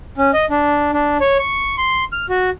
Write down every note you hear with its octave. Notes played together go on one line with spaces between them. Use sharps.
C#4
D#5
D4
D4
C#5
C#6
C6
F6
F#4